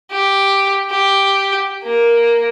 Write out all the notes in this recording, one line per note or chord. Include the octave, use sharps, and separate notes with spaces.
G4
G4
A#3